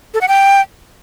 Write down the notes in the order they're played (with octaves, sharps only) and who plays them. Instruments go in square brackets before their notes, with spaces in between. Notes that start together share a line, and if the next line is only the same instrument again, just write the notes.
[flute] A4
F#5
G5